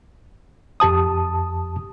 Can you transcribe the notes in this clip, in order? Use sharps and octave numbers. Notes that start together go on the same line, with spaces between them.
F2 G4 A5 D#6